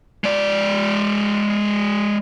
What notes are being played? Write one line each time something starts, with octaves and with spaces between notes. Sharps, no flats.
G#3 D5